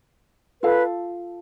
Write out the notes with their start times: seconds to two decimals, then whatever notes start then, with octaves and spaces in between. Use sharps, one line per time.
0.62 F4 A4 B4 F5